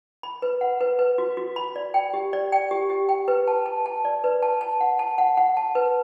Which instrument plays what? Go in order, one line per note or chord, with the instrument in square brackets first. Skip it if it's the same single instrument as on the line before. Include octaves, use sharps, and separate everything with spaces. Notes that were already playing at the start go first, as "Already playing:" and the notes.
[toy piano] B5
B4
F#5
B4
B4
F#4
F#4
B5
D5
G5
G4
D5
G5
G4
G4
G5
B4
A5
A5
A5
D5
B4
A5
A5
F#5
A5
F#5
F#5
A5
B4